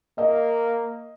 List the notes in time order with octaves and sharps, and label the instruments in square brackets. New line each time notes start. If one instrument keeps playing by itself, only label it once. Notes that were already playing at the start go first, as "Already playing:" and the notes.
[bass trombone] A#3 [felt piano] D#5